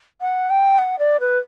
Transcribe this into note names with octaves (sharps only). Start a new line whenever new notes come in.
F#5
G5
F#5
D5
B4